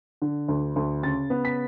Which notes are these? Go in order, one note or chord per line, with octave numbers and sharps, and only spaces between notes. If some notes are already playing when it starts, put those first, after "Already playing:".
D3
D2
D2
C#3 A6
B3
B6